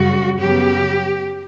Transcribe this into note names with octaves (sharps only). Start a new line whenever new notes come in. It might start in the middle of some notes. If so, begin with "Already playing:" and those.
Already playing: F#2 C#3 G3 F#4
F#2 C#3 F#3 B3 G4